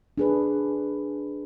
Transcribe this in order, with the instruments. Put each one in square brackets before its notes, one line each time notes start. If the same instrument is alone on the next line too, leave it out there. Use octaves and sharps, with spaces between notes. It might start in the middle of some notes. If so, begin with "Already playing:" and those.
[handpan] D4 G#4 B4